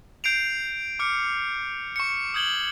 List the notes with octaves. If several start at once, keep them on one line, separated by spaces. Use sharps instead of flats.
G6 C7 D7 F7
D6 F6 C#7
C#6 C#7
D#6 G6 G#6 F#7 G7